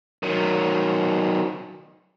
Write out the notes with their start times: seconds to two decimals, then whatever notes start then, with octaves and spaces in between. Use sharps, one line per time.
0.23 D#3 F#3